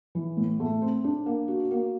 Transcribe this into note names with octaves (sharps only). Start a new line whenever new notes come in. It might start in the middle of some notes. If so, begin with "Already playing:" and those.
E3
A2
A3
C4
D4
A#3
F#4
A#3